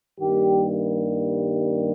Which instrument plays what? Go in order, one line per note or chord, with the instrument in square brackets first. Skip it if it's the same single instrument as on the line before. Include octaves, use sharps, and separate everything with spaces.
[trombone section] G2 D#3 G3 A#3 G4